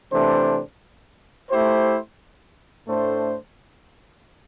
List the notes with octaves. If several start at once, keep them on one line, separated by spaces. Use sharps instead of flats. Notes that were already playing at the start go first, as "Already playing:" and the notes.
C3 E3 A3 D4 C5
A3 E4 G4 C5
A2 A3 D4 C5